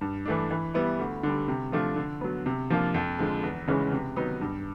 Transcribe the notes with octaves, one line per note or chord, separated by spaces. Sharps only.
G2
E3 A3 D4
E3
G3 B3 E4
D2
D3 G3
C3
F3 A3 D4 F4
D3
F#3 B3
C3
F3 A#3 D4 F4
F2
D3 F3 G#3
E2
C#3 E3 G#3 C#4
C3
D#3 F#3 B3 D#4
G2